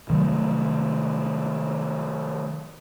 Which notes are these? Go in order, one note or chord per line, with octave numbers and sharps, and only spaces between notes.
C3 D#3 F#3 A3